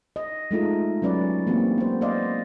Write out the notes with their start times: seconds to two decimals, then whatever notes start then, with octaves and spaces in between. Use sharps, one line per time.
0.16 D#5
0.51 G#3 A3 D#4 F4
1.02 F#3 C#4 B4 D5
1.47 E3 A#3 C4 G4
1.78 B3 C5
2.01 B3 C5 D5 D#5 F5